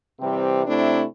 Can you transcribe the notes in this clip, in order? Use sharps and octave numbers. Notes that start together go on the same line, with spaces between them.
C3 E3 G3 C4 G4
C3 A3 C4 D4 E4